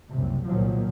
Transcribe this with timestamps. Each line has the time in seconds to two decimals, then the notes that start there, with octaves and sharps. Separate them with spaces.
0.11 F#1 C2 C3
0.47 C2 A#2 D#3 F3 F#3